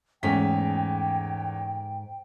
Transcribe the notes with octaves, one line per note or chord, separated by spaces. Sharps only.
E2 G#2 A3 C#4 G5 B6